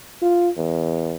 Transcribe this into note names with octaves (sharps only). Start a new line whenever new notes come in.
F4
E2